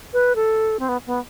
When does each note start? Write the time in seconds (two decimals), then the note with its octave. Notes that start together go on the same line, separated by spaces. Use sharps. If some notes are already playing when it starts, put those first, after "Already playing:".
0.13 B4
0.35 A4
0.80 C4
0.89 B3
1.07 B3